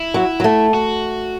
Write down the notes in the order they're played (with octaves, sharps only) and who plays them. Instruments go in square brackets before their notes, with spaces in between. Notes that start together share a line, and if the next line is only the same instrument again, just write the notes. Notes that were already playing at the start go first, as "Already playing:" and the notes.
Already playing: [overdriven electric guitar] E4
[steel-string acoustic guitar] F#3
F#3
A3
[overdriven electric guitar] F#4